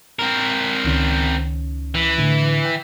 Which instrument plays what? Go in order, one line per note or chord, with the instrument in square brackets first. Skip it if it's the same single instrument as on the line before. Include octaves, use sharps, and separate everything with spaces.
[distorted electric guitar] C4 A#4
[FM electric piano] C#2 D#3 C#4
[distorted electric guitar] E3
[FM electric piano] A2 D3
G5